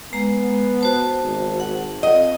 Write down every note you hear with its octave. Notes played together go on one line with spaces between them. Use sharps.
G#3 B3 A#5
F#4 C5 A5
G#1
F#5
F2 D#5